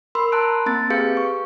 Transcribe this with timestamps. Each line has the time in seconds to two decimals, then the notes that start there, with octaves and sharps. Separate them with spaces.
0.15 A#4 B5 C6 E6
0.32 A5 A#5 F#6 D7
0.66 A#3 C4 A6
0.90 G4 G#4 B4 F5 G6 C#7
1.17 C#6